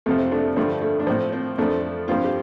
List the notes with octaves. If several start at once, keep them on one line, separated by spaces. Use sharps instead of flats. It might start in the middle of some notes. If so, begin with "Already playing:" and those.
F2 C3 F3 A3
C4
A3 D4
G2 D3 F3 A3 D4
A3
D4
A2 F3 C4
C4
F2 F3 A3 D4
G2 F3 C4 F4
G4